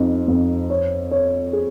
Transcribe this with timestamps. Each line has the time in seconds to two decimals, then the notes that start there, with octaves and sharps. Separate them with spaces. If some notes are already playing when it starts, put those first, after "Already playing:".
Already playing: F2 D#4
0.28 F2
0.70 C#5
1.11 C#5
1.53 G#4